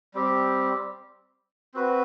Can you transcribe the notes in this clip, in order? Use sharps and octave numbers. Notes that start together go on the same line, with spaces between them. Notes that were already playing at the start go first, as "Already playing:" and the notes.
G3 C4 G4
C4 F#4 B4